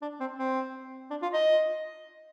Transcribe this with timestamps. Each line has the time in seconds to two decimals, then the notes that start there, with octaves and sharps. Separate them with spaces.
0.02 D4
0.20 C4
0.39 C4
1.10 D4
1.22 F4
1.34 D#5